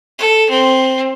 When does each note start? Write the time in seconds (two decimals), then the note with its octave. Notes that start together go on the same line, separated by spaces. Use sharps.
0.18 A4
0.49 C4